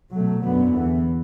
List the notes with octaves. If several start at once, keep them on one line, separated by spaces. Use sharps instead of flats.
B2 F#3 A3
F#2 D3 F#3 B3
E2 E3 B3